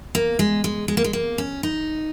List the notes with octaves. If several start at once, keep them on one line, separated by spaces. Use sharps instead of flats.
A#3
G#3
G#3
G#3
A#3
G#3
A#3
C#4
D#4